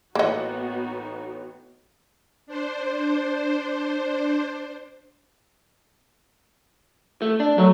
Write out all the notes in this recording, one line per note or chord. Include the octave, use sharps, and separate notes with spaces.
A1 A2 A#3 B3 D#4 F#4 D#5 F#5
D4 C5
A3
D4
F#3 A3